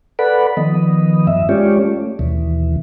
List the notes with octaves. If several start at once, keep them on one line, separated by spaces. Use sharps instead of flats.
A4 B4 D5 F#5 B5
D#3 F3 B3 D#5
G2 E5
G#3 C#4 F4 G4 C#5 D5
A3
D#2 B2 E3